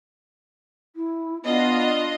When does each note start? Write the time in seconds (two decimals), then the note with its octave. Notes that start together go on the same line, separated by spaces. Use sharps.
0.96 E4
1.44 B3 D4 F4 D#5